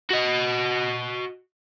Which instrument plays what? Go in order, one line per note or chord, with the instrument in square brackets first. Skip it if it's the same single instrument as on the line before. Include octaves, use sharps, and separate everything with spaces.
[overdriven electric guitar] F#4 D#5